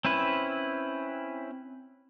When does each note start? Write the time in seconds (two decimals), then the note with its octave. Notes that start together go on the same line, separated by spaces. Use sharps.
0.05 C4 C#4 E4 B4